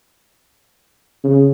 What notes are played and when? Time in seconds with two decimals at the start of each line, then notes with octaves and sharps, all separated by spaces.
1.24 C#3